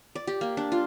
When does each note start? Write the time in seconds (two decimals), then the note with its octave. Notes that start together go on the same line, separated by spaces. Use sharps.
0.15 D5
0.27 G4
0.41 A#3
0.57 D4
0.72 F4